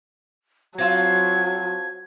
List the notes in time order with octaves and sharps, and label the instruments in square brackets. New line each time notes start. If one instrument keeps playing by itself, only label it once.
[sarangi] F#3 [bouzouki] C4 F4 A4 [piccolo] G#6